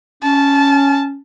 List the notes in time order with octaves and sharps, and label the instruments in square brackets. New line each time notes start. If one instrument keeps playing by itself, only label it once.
[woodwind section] C#4 [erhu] A5